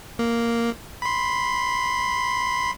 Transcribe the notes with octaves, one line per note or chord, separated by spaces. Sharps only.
A#3
B5 C6